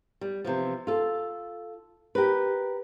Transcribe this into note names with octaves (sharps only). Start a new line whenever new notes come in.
G3
C3 E3 F3
F4 A4
G4 A#4 B4